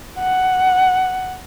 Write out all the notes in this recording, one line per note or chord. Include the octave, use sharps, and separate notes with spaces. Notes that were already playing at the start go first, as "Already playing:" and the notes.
F#5